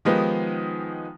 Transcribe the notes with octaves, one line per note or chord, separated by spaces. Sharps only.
D#3 F3 G#3 B3 D#4 G4